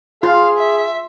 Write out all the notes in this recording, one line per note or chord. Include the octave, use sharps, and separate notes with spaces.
F4 G#4 F5 C6
E5